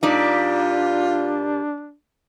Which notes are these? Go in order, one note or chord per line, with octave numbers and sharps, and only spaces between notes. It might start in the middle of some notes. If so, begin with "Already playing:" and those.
A#2 G3 D4 D#4 F4 D5